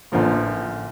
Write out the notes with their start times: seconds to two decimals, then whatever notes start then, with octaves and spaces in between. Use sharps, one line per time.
0.12 A1 D3 F3 A#3